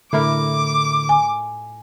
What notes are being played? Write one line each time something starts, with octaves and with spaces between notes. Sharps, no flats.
A2 D3 E4 A#4 D6
G#5